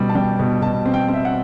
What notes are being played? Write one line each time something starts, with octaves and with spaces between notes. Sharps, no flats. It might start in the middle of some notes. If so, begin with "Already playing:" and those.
Already playing: B2 G3
A5
G3 G5
B2
B2 A5
C4
G5
C4
E5
F#5